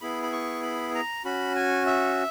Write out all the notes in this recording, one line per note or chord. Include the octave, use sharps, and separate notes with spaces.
B3 E4 G#4 B5
B5
C#6
B5
A#5
C#4 F#4 B5
G#5
E5